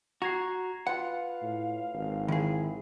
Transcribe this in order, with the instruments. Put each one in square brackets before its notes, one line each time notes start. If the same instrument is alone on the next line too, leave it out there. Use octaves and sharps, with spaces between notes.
[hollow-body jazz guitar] F#4 [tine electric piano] A#5 G#6 C7
[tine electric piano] F4 B4 [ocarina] F5 [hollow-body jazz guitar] F#5
[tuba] A2
G#1
[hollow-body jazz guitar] D#3 G#4 [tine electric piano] E4